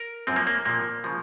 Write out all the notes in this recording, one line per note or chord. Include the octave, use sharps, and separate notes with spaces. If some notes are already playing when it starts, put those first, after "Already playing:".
Already playing: A#4
F#2 F3 C4
A#3
A#3
A#2 F3 A#3
C#3 F3